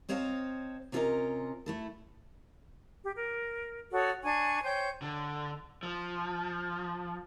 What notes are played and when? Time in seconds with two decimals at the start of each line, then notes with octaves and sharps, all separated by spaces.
0.09 C4 C5 C#5 D#5 F5 A5
0.92 C3 C#4 F4 A4 A#4 D#5
1.66 A3 E4 A4
3.03 G4
3.16 A#4
3.93 F#4 A4 C#5 D#6
4.23 D4 G#5 C#6
4.64 C5 C#5 G5 G6
5.02 D3
5.83 F3